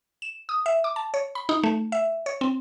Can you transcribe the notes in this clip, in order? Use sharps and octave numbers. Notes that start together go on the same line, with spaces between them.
E7
D#6
E5
D6
A5
C#5
B5
D#4
A3
E5
C#5
C4